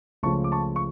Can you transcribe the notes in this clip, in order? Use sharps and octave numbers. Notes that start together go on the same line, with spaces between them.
C#2 C#3 F3 A3 A5 C#6
D6
A5 C#6
C#6